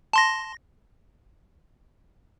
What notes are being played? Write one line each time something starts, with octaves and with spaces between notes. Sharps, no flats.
A5 C6 A#6